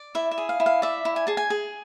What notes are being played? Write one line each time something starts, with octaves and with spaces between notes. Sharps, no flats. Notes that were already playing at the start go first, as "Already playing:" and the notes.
Already playing: D5
E4 E5
E5
G#4
F5
E4
F5
D5 E5
E4
G#5
G#4 A5
G#5
G#4